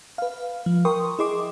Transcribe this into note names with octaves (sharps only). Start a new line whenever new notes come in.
B4 F5
F3
A#4 G5 C6 C#6 D#6
E4 G#4 D#5 C6 D6